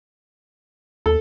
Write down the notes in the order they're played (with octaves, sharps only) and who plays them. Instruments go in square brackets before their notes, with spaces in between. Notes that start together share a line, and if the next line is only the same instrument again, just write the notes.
[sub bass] D#2 [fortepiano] A4